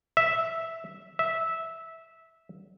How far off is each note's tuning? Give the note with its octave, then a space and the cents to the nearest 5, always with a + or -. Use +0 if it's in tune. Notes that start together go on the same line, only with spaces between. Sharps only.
E5 -5
E5 -10